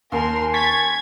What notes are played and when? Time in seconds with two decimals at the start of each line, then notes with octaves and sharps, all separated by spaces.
0.12 D#2 A#4 G#5 C6
0.54 C#6 G#6 A6 B6